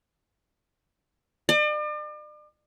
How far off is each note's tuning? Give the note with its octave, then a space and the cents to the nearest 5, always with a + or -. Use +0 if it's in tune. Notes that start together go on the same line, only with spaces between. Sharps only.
D5 +40